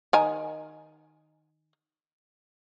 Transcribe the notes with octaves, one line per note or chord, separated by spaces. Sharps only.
D#3 G#5 A#5